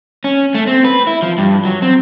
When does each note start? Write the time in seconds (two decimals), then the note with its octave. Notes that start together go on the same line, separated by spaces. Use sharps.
0.24 C#4
0.55 A3
0.67 C4
0.85 B4
1.07 E4
1.22 F3
1.38 G2
1.65 F#3
1.82 C4